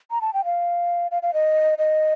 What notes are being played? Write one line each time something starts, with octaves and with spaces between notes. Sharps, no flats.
A#5
A5
G5
F5
F5
F5
D#5
D#5